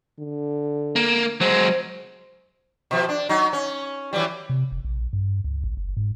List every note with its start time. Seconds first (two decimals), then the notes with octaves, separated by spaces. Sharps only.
0.19 D3
0.96 A#3
1.41 F#3 G#3 C5
2.91 B2 F3
3.09 D4
3.29 F#3 D#4
3.53 C#4
4.13 E3 F#3 G3
4.50 C3
4.72 F1
4.84 A#1
5.13 G2
5.44 C#2
5.64 A1
5.77 F#1
5.97 G#2